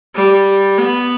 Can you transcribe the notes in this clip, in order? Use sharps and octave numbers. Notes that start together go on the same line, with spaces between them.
G3
B3